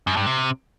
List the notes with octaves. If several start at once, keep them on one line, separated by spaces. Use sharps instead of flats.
F#2
G2
C3